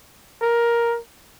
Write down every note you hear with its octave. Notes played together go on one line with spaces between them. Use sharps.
A#4